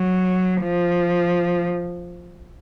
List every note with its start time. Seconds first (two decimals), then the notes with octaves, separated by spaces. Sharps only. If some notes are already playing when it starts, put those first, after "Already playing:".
Already playing: F#3
0.62 F3